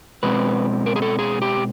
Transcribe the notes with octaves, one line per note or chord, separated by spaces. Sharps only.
B2 G#3 C4 B4
A#4
G#4
A4
G#4
G4